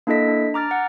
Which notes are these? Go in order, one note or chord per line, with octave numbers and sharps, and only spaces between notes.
A#3 D4 E4 A4 D#5 B6
D4
A#5 D6 F6 A6
F#5